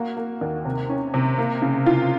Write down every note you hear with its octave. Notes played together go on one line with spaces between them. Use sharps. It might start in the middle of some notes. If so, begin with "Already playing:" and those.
Already playing: A#3 F#4
A#3
D#2
C3
C#4
C3
A#3
C#3
F4